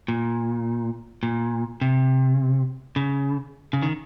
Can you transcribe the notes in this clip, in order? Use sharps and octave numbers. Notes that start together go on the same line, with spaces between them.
A#2
A#2
C3
C#3
C#3
D#3